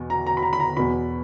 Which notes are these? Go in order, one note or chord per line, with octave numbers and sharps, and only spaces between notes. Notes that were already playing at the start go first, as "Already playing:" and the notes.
Already playing: E2 B2
A#5
A#5
B5
A#5
B5
A#5
E2 B2 B5